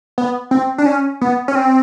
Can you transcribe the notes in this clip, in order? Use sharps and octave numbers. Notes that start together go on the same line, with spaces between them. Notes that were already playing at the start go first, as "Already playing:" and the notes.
B3
C4
D4
C#4
B3
C#4
C4